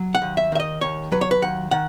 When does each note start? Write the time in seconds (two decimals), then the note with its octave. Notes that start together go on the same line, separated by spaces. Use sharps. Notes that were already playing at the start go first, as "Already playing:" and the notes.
Already playing: F#3
0.15 F#5
0.22 D#2
0.37 E5
0.52 D#3 E5
0.60 D#5
0.81 D#2 C#5
1.12 F#3 B4
1.21 C#5
1.31 B4
1.42 D#2 F#5
1.71 D#3 F#5